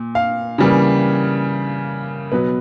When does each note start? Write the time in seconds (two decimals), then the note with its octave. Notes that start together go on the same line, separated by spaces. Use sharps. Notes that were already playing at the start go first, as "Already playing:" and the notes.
Already playing: A#2
0.15 F5
0.58 C#3 E3 G3 A#3
2.32 B2 F#3 B3 B4